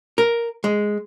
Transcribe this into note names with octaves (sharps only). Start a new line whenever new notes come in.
A#4
G#3